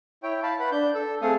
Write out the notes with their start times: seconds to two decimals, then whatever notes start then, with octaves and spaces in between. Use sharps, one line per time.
0.23 E4 C#5 G5
0.43 F5 A5 B5
0.59 B4 F#5 B5
0.72 D4 G6
0.95 A4 E6
1.22 A3 C4 G#4 A4 F5 D#6